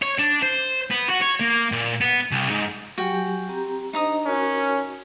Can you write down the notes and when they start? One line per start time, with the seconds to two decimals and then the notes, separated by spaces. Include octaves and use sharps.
0.02 C#5
0.19 D4
0.42 C5
0.90 B3
1.09 F#4
1.21 C#5
1.40 A#3
1.72 A#2
2.01 B3
2.31 C2
2.50 G#2
2.98 F#3 F#4 G4 G5 G#5
3.49 C4 G4 A#5
3.93 D4 D#4 C5 D#5 A#5 D#6
4.26 C#4 F#4 A#4